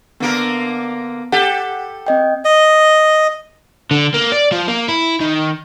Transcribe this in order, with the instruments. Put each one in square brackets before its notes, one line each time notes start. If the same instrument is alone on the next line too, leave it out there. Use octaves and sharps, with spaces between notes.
[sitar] D3 A#3 A#4 [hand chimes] B3 D7
[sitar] G4 A4 [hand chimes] F#5
[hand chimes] C4 D#5 G5
[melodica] D#5
[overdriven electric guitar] D3
A#3
D5
F3
A#3
E4
D#3